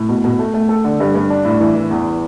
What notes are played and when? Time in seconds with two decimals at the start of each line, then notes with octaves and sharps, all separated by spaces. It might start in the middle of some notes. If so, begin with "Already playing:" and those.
Already playing: A2
0.09 B2
0.24 B2
0.39 A3
0.54 A3
0.69 A4
0.84 D3
1.00 G2
1.15 G2
1.30 D4
1.45 A2
1.60 E3
1.75 E3
1.90 E2